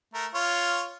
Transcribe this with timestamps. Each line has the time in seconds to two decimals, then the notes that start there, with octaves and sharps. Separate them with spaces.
0.14 A3 A#4
0.34 F4 C#5